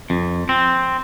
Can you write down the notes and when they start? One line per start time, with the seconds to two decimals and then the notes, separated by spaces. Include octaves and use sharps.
0.10 F2
0.49 C4